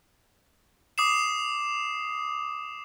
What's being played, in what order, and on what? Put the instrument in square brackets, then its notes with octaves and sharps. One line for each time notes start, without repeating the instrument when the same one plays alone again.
[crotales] D6 D#6 C7 E7